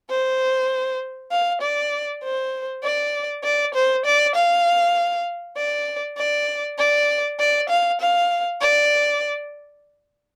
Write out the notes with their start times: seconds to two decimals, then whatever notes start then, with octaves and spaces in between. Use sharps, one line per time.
0.10 C5
1.31 F5
1.62 D5
2.23 C5
2.84 D5
3.44 D5
3.75 C5
4.06 D5
4.35 F5
5.57 D5
6.17 D5
6.78 D5
7.39 D5
7.70 F5
8.01 F5
8.61 D5